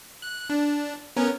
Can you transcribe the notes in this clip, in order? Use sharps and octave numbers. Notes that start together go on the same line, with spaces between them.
F#6
D4
B3 C#4 A#4